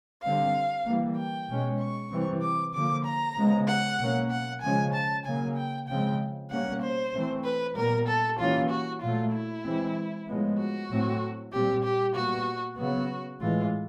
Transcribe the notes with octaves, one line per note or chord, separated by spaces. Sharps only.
D3 G3 C4 F5
E3 G3 A#3
G5
B2 G#3 C#4
C#6
C3 E3 G3 C4
D6
D3 F3 A#3 D6
A#5
C#3 F3 G#3 B3
F#5
B2 F#3 A#3 C#4
F#5
C#3 F3 G#3 C#4 G#5
A5
C#3 F#3 A#3 G#5
G5
C#3 F3 G#3 C4 G5
B2 G3 A#3 C#4 F#5
C5
E3 A3 C4
B4
A#2 G3 B3 A#4
A4
E3 G3 A#3 C#4 F4
F#4
A#2 F#3 A3 F4
E4
E3 G#3 C4
A2 F3 G#3 B3
F#4
A2 F#3 A3 C4
A#2 G3 C4 G4
G4
A#2 G3 B3 F#4
C#3 F#3 B3 F#4
A2 E3 G#3 F4